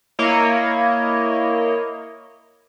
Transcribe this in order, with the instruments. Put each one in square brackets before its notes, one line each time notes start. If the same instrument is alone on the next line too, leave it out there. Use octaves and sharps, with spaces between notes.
[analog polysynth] A#3 E4 C#5 D#5